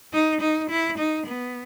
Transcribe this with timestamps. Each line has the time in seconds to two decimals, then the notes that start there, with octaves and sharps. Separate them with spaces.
0.13 D#4
0.41 D#4
0.70 E4
0.98 D#4
1.27 B3